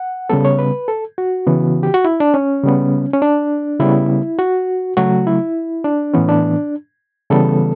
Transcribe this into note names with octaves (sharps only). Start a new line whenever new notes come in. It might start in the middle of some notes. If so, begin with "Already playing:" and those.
Already playing: F#5
C#3 G3 B3 A4
C#5
B4
A4
F#4
C#3 E3 B3
G4
F#4
E4
D4
C#4
C#3 G3 B3
C#4
D4
C#3 G3 B3 E4
F#4
C#3 F#3 A3 F#4
E4
D4
A2 E3 B3 C#4
D4
C#3 E3 G3 B3 A4